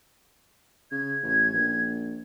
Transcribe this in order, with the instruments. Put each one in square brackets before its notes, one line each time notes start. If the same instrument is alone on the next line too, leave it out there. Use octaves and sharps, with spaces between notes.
[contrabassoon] C#3 [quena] G#6
[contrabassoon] A1
A#1